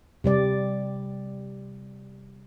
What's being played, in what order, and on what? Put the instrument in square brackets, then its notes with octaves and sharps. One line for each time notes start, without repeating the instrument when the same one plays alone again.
[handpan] C3 G3 D5